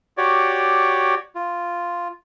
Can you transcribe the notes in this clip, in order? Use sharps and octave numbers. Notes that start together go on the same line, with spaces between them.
F#4 G4 C#5 D5
F4